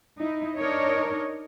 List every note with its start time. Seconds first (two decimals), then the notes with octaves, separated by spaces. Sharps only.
0.19 D#4 E4
0.57 D4 D#4 A#4 C#5 D#5